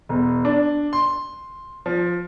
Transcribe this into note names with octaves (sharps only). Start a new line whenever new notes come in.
E1
D4
C6
F3